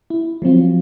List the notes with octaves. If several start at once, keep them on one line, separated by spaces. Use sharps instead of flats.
E4
F3 F#3 C4 F4